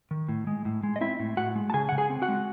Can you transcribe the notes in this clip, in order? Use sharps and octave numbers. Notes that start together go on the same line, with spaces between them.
D#3
A2
G#3
A2
G#3
D#5
C4 E4 E5
A2
A2 F#4 F#5
G#3
A5
C#3 G#4 G#5
C#3 F#5
G#4 G#5
C4
F#4 F#5
G#3